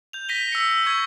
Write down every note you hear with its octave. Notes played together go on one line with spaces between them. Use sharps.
G6 F7
A#6 B6 D#7 G7
E6 C#7
E6
C#6 G#6